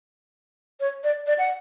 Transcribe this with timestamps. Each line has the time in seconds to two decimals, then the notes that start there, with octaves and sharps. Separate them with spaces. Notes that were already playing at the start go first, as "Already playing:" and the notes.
0.80 C#5
1.04 D5
1.27 D5
1.38 F#5